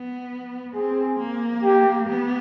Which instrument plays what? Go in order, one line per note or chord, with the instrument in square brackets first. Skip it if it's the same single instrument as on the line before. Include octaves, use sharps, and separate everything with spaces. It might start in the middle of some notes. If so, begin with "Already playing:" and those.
Already playing: [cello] B3
[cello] C4 [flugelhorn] G#4
[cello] A#3
[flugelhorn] G4
[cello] B3